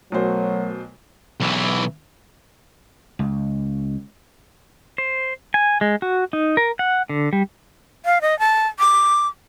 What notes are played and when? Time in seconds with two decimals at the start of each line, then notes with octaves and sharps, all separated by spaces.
0.12 B1 B2 F#3 A3 A#4 C5
1.40 B1 E3
3.19 C#2
4.98 C5
5.54 G#5
5.81 G#3
6.02 F#4
6.33 D#4
6.57 A#4
6.79 F#5
7.09 D3
7.33 G3
8.05 F5
8.22 D#5
8.39 A5
8.79 D6